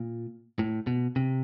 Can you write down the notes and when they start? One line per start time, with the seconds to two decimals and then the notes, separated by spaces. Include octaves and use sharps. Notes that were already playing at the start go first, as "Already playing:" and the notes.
Already playing: A#2
0.59 A2
0.87 B2
1.16 C3